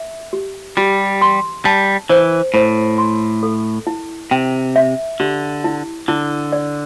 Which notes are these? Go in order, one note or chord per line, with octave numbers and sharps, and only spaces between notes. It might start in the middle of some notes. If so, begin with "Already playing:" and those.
Already playing: E5
G4
G3 G4
C6
G3 A5
E3 C5
A2 C5
C6
A4
E4
C3 G5
E5
D3 G4
E4
D3 E4
D5